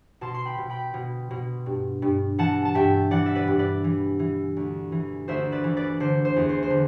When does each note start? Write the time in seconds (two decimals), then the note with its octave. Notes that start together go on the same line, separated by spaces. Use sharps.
0.21 B2 A5 C6
0.34 C6
0.45 G5 B5
0.58 B2
0.70 G5 B5
0.94 B2
1.31 B2
1.66 G2
2.02 G2
2.38 E3 F#5 A5
2.65 A5
2.75 G2 E5 G5
3.11 E3 D5 F#5
3.26 E5
3.35 B4 D5
3.48 G2
3.59 B4 D5
3.84 E3
4.19 E3
4.57 D2
4.92 E3
5.28 D2 C5 E5
5.52 B4 D5
5.64 E3
5.77 B4 D5
6.00 D3 C5
6.25 C5
6.36 E2
6.49 C5
6.63 C5
6.70 D3